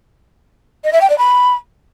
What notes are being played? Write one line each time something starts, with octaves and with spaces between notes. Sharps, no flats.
D#5
E5
G5
D5
B5